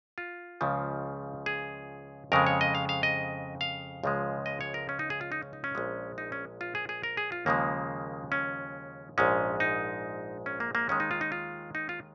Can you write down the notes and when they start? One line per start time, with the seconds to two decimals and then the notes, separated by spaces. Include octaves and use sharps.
0.18 F4
0.61 C#2 C#3 F3
1.46 G#4
2.32 F2 C#3 G#3 A#4
2.47 C#5
2.61 D#5
2.75 F5
2.89 F5
3.03 D#5
3.61 F5
4.04 C#2 C#3 F3 G#3
4.46 D#5
4.61 C#5
4.74 A#4
4.89 C#4
4.99 D#4
5.10 G#4
5.21 F4
5.32 D#4
5.43 C#4
5.53 D#4
5.64 C#4
5.75 A#1 A#2 G#3
6.18 D#4
6.32 C#4
6.61 F4
6.75 G#4
6.89 G#4
7.03 A#4
7.17 G#4
7.32 F4
7.46 D#2 C#3 F3 G#3 A#3
8.32 C#4
9.18 A#1 G#2 G#3 C#4
9.60 D#4
10.46 C#4
10.60 A#3
10.75 A#3
10.89 D#2 D#3 G#3 C#4
11.00 D#4
11.11 F4
11.21 D#4
11.32 F4
11.75 D#4
11.89 F4